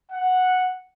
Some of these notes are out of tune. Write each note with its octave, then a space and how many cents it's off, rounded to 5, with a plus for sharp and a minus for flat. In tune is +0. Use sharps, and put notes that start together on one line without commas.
F#5 -5